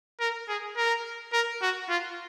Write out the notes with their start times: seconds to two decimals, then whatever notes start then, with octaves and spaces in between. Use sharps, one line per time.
0.20 A#4
0.49 G#4
0.77 A#4
1.33 A#4
1.62 F#4
1.89 F4